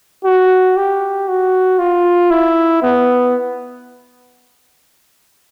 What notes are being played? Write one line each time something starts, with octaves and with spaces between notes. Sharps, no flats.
F#4
G4
F#4
F4
E4
B3